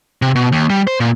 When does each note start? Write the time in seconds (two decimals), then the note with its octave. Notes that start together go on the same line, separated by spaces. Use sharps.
0.22 C3
0.35 B2
0.52 D#2
0.70 G3
0.87 C5
1.00 A#2